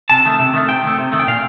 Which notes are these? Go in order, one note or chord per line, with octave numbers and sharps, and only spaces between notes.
C3 A5
D#3 A3
C3
D#3 A3
C3 G5
D#3 A3
C3
D#3 A3
G5
A#2 F5